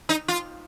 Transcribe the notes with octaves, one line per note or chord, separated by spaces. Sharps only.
D#4
F4